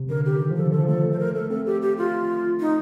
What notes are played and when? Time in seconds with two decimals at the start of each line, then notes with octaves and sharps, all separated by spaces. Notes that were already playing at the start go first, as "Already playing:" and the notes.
Already playing: C3
0.10 D3 A#4
0.25 G4
0.41 D#3
0.51 F3
0.56 A4
0.62 D3
0.72 F3 A4
0.88 A3 A4
1.12 C5
1.19 A#4
1.35 A3 A4
1.50 C4 A4
1.66 G4
1.82 G4
1.98 F4
2.60 D#4